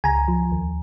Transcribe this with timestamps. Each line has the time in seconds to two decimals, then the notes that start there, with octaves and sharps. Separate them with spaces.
0.04 C#2 G#5 A#5
0.28 F3
0.52 D#2